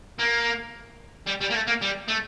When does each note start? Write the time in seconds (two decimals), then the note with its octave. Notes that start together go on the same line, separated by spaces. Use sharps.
0.19 A#3
1.27 G3
1.41 G3
1.51 A#3
1.55 A3
1.68 A#3
1.82 G3
2.08 A3